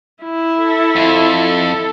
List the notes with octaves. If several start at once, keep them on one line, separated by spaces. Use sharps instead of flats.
E4
A4
F2